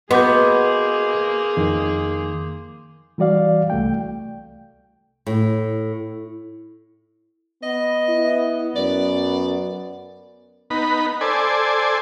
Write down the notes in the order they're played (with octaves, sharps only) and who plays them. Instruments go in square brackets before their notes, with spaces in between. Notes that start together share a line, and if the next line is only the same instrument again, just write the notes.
[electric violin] A#3 G#4 [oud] B3 [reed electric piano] F#4 D#5 [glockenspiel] C6 D6 G6
[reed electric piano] F2 D#3
E3 G3 F#4 D5 F5
C2 A3 G5
[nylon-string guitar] A2
[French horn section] B3 [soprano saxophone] D#5
[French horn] E4
[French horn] F#2 [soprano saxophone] D5
[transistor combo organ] B3 D#4 B5
A4 C5 D5 G#5